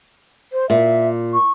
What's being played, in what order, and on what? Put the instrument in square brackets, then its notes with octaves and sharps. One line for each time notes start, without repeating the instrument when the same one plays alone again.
[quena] C5
[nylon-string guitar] A#2 [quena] E5
[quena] C#6